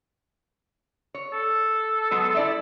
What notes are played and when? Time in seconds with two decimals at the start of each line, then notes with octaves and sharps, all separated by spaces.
1.14 C#5
1.33 A4
2.11 F#3 G#3 B3
2.35 E4 D5 E5